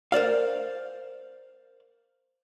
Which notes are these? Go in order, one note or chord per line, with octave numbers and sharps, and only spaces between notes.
A#4 C5 D5 F5